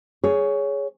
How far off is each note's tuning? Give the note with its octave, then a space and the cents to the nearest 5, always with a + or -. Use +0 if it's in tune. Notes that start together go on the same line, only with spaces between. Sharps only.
G#4 +0 C#5 +15